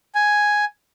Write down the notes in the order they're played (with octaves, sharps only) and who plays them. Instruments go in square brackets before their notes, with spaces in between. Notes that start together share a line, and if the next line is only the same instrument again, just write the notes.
[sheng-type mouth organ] G#5